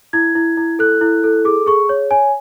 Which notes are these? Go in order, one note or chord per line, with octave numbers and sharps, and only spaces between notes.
E4 G#6
E4
E4
A4 F#6
E4
A4
G#4 D6
G#4 C#6
C#5
C#5 G#5